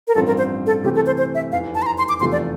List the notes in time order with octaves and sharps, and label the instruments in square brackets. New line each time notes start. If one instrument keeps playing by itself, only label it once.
[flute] A#4
[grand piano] A1 G2 F3 C4 [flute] A4
[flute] A#4
C5
A4
[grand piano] C3 E3 A3 C4 [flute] G4
[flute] A4
C5
C5
E5
[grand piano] F1 E2 E3 [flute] F5
[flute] A5
C6
A#5
C6
D6
[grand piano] F1 E2 C3 F3 A3 [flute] C6
[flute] D5